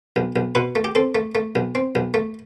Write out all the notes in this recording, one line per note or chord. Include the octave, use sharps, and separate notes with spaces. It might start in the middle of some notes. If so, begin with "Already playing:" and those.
B1
B1
B2 B4
A3
G4
C4 A4
A3
A3
B1
C4
B1
A3